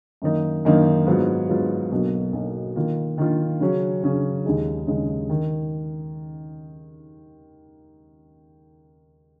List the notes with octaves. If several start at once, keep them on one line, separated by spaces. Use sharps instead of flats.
F#2 D#3 A#3 D#4
F#2 D#3 A#3 D#4
G#2 F#3 B3 F4
G#2 F#3 B3 F4
B1 B2 F#3 A#3
B1 B2 F#3 A#3
D#3 A#3 F4
D#3 A#3 F4
C#3 F#3 C#4
C#3 F#3 C#4
D#2 C#3 G#3 D#4 G#4
D#2 C#3 G#3 D#4 G#4
D#3